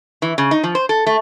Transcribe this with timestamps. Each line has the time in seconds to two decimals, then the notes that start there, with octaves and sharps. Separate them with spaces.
0.22 E3
0.38 C#3
0.51 D#4
0.64 F3
0.75 C5
0.89 A4
1.06 A3